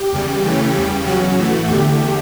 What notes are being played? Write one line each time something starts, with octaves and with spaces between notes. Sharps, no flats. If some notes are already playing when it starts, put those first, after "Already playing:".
Already playing: G4
E2 C#3 G3
C#3 E3 A3 C#4
E2 C#3 G3
E2 C#3 F#3 C#4 F#4
A2 E3 A3
E2 D3 A3 G4